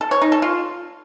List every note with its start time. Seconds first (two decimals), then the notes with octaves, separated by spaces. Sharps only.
0.01 A4
0.11 C#5
0.22 D#4
0.32 A4
0.42 F4